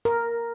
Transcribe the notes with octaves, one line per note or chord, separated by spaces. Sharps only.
A#4